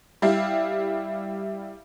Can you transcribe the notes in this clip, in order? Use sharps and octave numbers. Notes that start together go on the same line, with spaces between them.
G3 E4 F5